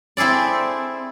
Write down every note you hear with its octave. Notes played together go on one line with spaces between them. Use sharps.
C4 E4 G#4 A4 D5